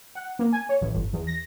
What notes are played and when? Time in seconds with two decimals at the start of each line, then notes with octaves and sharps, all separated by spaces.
0.15 F#5
0.39 A#3
0.53 G#5
0.69 C#5
0.81 A1
0.93 G1
1.13 E2
1.27 A#6